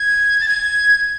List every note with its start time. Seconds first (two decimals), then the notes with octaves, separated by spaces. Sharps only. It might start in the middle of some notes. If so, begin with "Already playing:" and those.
Already playing: G#6
0.41 A6
0.48 G#6